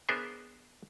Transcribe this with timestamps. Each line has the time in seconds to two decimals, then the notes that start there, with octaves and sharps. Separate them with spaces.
0.09 B3 D4 G#4 A#4 C5 E5